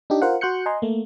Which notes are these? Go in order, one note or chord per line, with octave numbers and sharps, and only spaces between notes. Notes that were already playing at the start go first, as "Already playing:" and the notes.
D4 D#4 G4
F4 A#4 C5 F5 F#5
F#4 C6 F#6 G6 C#7
D#5 G#5 A#5 C6
A3 A#3